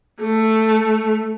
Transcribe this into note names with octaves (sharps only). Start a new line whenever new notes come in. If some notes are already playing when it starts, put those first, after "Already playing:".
A3